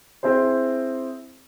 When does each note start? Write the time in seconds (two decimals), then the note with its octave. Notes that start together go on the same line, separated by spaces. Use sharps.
0.23 C4 E4 G#4 C5